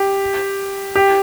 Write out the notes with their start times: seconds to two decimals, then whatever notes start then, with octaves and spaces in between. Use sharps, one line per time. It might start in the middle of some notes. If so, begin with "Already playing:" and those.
Already playing: G4
0.95 G4